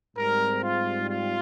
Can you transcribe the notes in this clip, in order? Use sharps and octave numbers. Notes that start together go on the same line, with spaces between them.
G#2 G3 C4 A#4
F4
F4